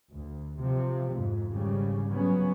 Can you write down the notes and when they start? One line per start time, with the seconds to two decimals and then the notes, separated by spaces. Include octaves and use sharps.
0.11 D2
0.59 C3 F3
1.11 F2 G#2
1.50 G#1 C#3 G3
2.10 C#3 F#3 B3 C#4